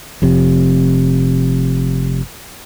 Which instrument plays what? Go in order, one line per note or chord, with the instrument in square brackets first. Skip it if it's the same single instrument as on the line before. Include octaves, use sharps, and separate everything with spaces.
[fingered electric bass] F1 F2 C3